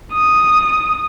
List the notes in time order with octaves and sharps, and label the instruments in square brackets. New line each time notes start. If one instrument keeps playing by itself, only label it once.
[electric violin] D#6